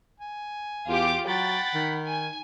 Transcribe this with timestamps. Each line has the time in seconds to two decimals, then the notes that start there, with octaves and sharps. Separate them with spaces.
0.20 G#5
0.87 E2 F4 G4 D6
1.27 F#3 F#5 G5 B5 A6
1.75 D#3
2.06 G#5